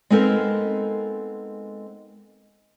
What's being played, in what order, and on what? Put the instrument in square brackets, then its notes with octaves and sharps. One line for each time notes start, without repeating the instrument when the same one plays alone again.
[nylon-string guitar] G#3 B3 C4 D#4 A4 A#4